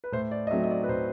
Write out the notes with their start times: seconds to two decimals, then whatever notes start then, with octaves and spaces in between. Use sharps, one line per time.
0.04 B4
0.12 A2 C5
0.31 D5
0.47 D#5
0.50 F#3 A3 C4 D#4 E5
0.64 D#5
0.71 D5
0.84 B4
0.89 A2 C5